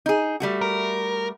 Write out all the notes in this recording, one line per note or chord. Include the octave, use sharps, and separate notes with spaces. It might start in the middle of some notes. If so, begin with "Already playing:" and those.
D#4 G#4
G3 A3 F#4
A#4